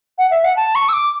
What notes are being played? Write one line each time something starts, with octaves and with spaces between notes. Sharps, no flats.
F#5
E5
F#5
A5
C#6
E6
D6